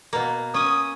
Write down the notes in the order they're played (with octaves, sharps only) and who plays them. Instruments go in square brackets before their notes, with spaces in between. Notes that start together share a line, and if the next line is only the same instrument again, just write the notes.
[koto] B2 A#3
[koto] C#4 [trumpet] D#6